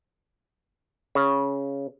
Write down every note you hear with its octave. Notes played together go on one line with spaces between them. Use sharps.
C#3